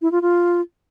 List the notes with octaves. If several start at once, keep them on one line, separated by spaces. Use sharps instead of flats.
E4
F4
F4